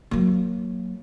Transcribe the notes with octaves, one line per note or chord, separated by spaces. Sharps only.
F#3 A#3